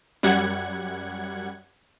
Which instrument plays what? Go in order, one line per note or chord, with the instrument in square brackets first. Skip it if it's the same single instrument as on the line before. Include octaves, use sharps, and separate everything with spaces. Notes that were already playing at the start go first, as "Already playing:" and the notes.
[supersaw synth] F#2 G3 F#5 G#6